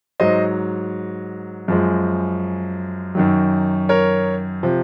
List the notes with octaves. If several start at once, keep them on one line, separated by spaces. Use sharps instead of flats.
G#2 F#3 C5 D#5
F#2 F3 G#3
F#2 D#3 F#3
A#4 C#5
C3 F3